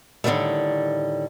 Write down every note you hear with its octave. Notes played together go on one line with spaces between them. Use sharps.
A2 D3 D#3 F#3 G3 A3